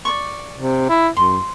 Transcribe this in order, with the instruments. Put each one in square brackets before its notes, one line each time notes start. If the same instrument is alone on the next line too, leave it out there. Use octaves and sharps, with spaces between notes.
[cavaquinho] D5 C#6
[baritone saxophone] C3
E4
[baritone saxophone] F#2 [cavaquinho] C6